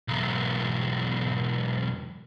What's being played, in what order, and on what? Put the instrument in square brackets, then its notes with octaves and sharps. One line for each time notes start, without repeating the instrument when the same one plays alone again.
[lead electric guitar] B1 E2